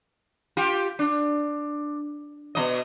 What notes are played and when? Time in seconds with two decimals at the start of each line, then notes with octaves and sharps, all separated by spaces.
0.57 F4 G4
0.99 D4
2.55 B2 F3 D#5